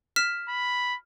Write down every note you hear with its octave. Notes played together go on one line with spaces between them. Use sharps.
F6 B6 E7
B5